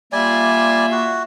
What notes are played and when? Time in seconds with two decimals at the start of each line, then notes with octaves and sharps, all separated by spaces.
0.13 G3 A#3 F4 D5 E5 G#5
0.92 F#4